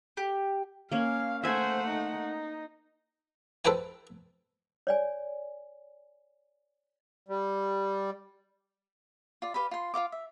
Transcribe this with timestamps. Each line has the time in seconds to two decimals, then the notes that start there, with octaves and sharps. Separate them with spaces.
0.17 G4
0.92 A#3 C#4 F5
1.43 A3 C5 E5 F#5 G#5
1.89 D#4
3.65 A4 B4 C5 G5 G#5
4.87 C#5 D5 G#5
7.28 G3
9.42 F4 D5
9.54 G4 B4 F5 B5
9.71 F4 C6
9.94 F4 C5 F5 D6
10.12 E5